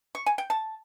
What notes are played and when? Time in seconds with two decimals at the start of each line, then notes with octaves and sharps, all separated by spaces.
0.15 C#6
0.26 G#5
0.38 G5
0.50 A5